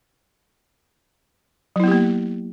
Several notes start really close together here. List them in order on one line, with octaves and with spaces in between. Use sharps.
F#3 E4 B3 G4 A#3